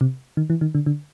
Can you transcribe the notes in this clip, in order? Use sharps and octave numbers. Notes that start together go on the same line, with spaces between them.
C3
D#3
E3
D#3
D3
D3